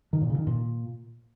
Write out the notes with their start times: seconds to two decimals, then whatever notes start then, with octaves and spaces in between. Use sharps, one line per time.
0.13 D#3
0.21 A#2
0.30 C#3
0.38 D#3
0.47 A#2